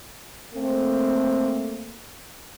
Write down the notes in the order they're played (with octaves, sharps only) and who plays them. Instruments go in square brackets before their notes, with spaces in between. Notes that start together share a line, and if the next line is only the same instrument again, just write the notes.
[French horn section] A3 A#3 C4